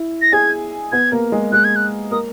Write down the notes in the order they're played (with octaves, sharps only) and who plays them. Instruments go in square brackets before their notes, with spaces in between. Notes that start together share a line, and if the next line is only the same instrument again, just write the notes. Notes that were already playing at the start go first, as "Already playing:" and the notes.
Already playing: [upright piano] E4
[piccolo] A#6
[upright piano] G#4 G#5 [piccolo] G#6
[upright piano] B3 B4 [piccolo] G#6
[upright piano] A#3 A#4
G#3 G#4
[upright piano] G#3 G#4 [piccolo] F#6
[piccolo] G#6
F#6
[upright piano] A#3 A#4 [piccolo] D#6